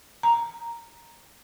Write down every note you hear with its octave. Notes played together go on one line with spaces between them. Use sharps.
A#5